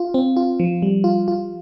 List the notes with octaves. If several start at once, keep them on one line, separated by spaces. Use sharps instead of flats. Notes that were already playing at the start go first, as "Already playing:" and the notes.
Already playing: F4
C4
F4
F3
G3
F4
F4